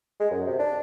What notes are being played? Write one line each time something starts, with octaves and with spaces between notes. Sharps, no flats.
G#3
F#2
C3
D4